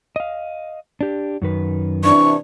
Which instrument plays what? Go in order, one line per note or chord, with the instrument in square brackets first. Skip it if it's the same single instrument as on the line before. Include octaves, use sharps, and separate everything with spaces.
[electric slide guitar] D#5 F5
D4 G4
F#2 D#3 B4
[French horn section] C3 E3 D4 [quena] C#6